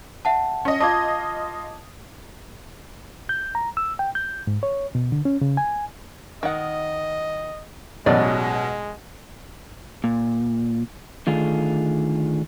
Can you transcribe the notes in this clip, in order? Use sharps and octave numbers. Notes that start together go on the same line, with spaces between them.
E5 F#5 A5
C#4 D#5
F4 D#5 A5 D6 G#6
G6
A#5
E6
G5
G6
G#2
C#5
B2
D3
C#4
C#3
G#5
D#3 D#5 F#5
A1 B2 F#3 G#3 D5 D#5
A#2
D3 D#3 A3 F4 G#4